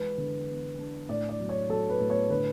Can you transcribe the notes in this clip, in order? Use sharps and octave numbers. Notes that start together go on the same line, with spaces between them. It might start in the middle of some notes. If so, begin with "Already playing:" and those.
Already playing: E3 G#3 B4
D3
B3
D4
A2 D5
D5
F#3
C#5
F#3 A4
B4
A2
C#5
D3 B4